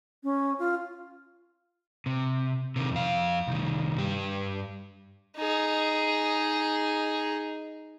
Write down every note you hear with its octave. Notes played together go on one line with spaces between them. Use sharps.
C#4
F4
C3
C3 D#3
F2 F5
C2 D#3
G2 G4
D#4 G#4